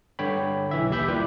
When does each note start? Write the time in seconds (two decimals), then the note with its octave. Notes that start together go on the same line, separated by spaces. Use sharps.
0.19 G2 D3 C#5 G5 B5
0.71 B1 E3 E5
0.91 D#2 G4 E5 B5 G6
1.08 A#2 G3 E4 G4 B4